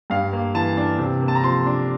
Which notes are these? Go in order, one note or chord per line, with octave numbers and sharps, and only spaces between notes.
G2 F5
A#3
E3 A5
D4
C3
A#3
A5
A#5
F3 C6
D4